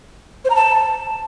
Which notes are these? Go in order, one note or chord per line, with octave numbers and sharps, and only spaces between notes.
C5
A#5
A5